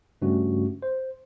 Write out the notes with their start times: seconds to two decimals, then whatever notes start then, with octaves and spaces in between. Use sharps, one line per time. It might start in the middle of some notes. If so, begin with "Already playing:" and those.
0.22 G2 C#3 A3 C#4 F#4
0.82 C5